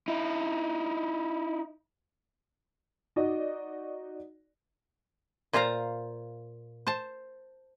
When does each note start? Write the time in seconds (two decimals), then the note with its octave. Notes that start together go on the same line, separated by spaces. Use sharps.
0.08 D#4 E4
3.16 D#4 F#4 D5 D#5
5.53 A#2 F4 C5 F5 A#5
6.87 C5 A5